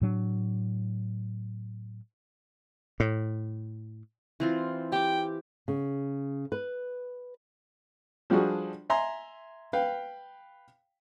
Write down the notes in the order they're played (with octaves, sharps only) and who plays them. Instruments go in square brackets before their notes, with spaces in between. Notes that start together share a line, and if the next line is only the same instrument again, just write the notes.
[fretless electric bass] A2 F#3 D4
[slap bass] A2
[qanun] E3 C4 F4
[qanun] G4 D6 [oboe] G5
[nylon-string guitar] C#3
B4
[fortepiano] F3 G3 D4 F#4 G#4
E5 G#5 A#5 C6
B4 F5 G5